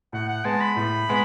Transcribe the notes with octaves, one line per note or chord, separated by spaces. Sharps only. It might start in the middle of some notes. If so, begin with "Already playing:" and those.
A2 F#5
F#5
G#3 B3 A5
B5
A2
G#3 B3